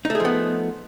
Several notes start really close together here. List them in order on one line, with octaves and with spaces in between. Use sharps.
D#4 A3 G#4 F3 B3